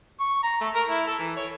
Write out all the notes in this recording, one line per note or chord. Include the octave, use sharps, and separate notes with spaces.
C#6
A#5
A3
A#4
E4
A4
E3
C#5